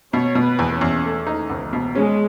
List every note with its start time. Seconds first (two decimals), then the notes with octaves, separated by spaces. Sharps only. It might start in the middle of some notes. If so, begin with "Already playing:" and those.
0.13 B2 C#5
0.35 B2
0.43 B4
0.59 E2
0.74 C#4
0.81 E2
1.04 A3
1.27 D#4
1.49 C#2
1.73 B2
1.95 G#3 C#4